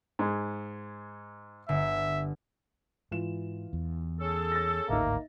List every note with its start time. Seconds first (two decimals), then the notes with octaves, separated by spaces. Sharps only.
0.19 G#2 G#3
1.69 G1 E5
3.11 G#2 E3 F4 E7
3.73 E2
4.20 C#4 G#4 A4
4.52 A6 A#6
4.89 G#1 D2 A2 A#3 D#4 D#5 E5